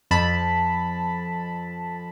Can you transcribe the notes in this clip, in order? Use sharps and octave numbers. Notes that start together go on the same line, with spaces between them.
F2 A5 B5